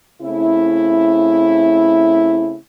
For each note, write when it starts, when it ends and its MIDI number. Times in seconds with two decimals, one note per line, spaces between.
0.22 2.56 49
0.22 2.56 57
0.22 2.56 60
0.22 2.56 64